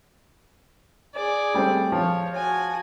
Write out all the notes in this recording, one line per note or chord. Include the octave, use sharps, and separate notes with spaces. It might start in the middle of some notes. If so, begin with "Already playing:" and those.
G#4 D5
G3 A3 C4
F3 C#5
F#4 G#5